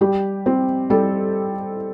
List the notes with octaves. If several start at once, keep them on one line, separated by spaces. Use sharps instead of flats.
G3 G4
C4
G3 A4